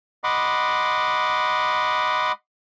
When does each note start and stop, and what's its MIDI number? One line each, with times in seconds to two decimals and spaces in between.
0.24 2.32 75
0.24 2.32 78
0.24 2.32 83
0.24 2.32 84
0.24 2.32 86